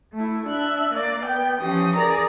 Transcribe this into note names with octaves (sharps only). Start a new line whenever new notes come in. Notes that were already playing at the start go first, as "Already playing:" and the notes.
A3 E4
D4 E5 F#6
A#3 D5
B3 G5
E3 F3 C#4 G4 D#6
G#4 A#4 D5 A#5